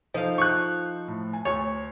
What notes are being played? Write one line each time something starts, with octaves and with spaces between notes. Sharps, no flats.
F3 D#4 A4 C5 F5
C#6 F#6
A2
G#5
D2 C#5